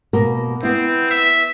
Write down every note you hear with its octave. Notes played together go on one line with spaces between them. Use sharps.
B2 A#3 A#4
B3 C4 E4
E5